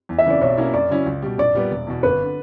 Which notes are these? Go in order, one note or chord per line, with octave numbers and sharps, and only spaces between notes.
E2
E5
C#3 E3 D5
B1 C#5
B2 A#3 C#4 E4
F#2 D5
C#3 F#3 C#4 E4
C#2
B2 G3
A#1 D5
A#2 G3 B3
E1
E2 B2
G1 B4
D3